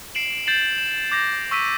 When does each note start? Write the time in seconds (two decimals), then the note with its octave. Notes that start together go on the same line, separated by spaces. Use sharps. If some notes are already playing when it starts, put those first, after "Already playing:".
0.15 C7 D7 E7 F#7
0.47 G6 A6 C7 E7 F#7
0.78 E7
1.11 D6 G6 A#6
1.51 C#6 E6 B6 D#7